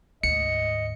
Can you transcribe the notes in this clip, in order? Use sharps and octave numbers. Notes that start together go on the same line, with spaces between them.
D2 G#2 D#5 C#7